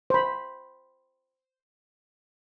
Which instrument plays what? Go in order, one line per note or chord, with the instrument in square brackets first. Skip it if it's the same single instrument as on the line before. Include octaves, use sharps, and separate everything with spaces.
[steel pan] C5 B5